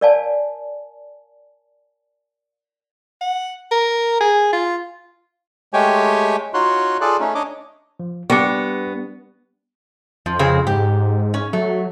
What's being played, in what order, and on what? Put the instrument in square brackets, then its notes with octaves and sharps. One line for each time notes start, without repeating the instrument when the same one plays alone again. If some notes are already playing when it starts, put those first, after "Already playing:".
[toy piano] A#4 C#5 D5 F5 G#5 A5
[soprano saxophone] F#5
A#4
G#4
F4
[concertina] G#3 A3 G4 C#5 G5 G#5
D#4 F4 F#4 C#5 C6 F#6
F4 G#4 A4 D5 F#6
A3 C#4 D#4
D4 C#5 D#5 D6
[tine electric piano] F3
[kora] G3 D4 [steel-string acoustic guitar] B3 [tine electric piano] C#6 A#6 C#7
[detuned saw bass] F2 [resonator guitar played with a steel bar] F3
[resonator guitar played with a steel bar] C#3 C4 G#4
[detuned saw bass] G#2 [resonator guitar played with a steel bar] G4
[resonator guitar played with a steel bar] C#4
[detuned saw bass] F#3 [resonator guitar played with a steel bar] A3